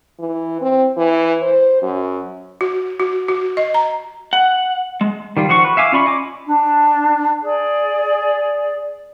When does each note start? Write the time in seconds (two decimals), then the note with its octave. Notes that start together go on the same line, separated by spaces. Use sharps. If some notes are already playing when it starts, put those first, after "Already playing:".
0.20 E3
0.61 C4
0.97 E3
1.42 C5
1.82 F#2
2.61 F#4
3.00 F#4
3.29 F#4
3.57 D#5
3.74 A#5
4.33 F#5
5.01 G#3
5.37 D#3 G3 F4
5.49 F3 F#4 F#5 C#6
5.64 B4
5.77 E5 F5 G#5 D6
5.92 C#4 F4 D5 B5 C#6
6.06 D#5 G#5 D6
6.46 D4
7.42 G#4 D5